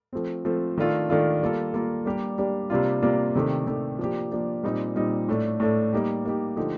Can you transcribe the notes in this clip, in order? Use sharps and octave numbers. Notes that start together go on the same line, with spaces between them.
F3 A3 C4
F3 A3 C4
D#3 A3 D4 F4 A4
D#3 A3 D4 F4 A4
G3 A#3 F4 A4
G3 A#3 F4 A4
G3 A#3 D4 G4
G3 A#3 D4 G4
C3 G3 A#3 D4 F4
C3 G3 A#3 D4 F4
C3 D#3 A3 D4 G4
C3 D#3 A3 D4 G4
F3 A#3 D4 G4
F3 A#3 D4 G4
A#2 G3 C4 D#4
A#2 G3 C4 D#4
A2 A3 D4
A2 A3 D4
G3 A#3 D#4 G4
G3 A#3 D#4 G4
D3 F3 A3 D#4 G4